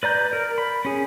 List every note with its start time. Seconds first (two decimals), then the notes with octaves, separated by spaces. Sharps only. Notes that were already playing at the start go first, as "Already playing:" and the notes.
0.03 B4 D5 A#5 G6
0.33 A#4
0.58 B5
0.85 C#4 G#4